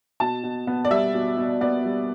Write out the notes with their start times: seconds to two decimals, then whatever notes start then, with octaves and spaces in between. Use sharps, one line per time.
0.20 B2 A5
0.43 B2
0.67 B3
0.85 D5
0.91 G3 E5
1.14 B2
1.37 B2
1.61 B3 D5
1.85 G3